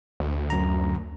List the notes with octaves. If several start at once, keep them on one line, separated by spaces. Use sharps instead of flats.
D2
F#2 A#5